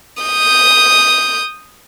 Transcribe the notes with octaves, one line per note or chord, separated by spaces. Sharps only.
D#6 G6